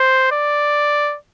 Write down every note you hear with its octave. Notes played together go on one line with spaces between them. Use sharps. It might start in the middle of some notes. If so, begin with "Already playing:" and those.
Already playing: C5
D5